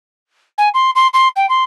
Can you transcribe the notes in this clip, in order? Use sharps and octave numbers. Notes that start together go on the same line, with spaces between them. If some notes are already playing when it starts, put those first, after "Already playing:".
G#5
C6
C6
C6
G5
C6